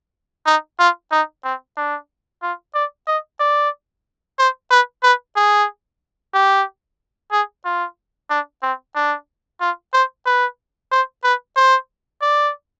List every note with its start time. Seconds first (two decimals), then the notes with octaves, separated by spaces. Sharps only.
0.46 D#4
0.79 F4
1.12 D#4
1.44 C4
1.77 D4
2.42 F4
2.75 D5
3.07 D#5
3.40 D5
4.39 C5
4.71 B4
5.03 B4
5.36 G#4
6.34 G4
7.32 G#4
7.65 F4
8.30 D4
8.63 C4
8.95 D4
9.61 F4
9.93 C5
10.26 B4
10.92 C5
11.24 B4
11.56 C5
12.22 D5